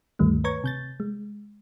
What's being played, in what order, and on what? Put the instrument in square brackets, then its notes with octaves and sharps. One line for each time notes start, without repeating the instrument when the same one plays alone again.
[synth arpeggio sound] D2 G2 D#3 G3 A3
B4 C#5 A#5 C#6 G#6
C3 G6 A6
G#3